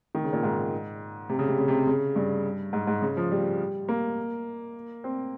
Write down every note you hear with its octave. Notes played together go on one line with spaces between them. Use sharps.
D#3
C#3
A#2
G#2
C3
C#3
C3
C#3
C3
C#3
G2
G#2
G#2
C#3
F3
G3
A#3
C4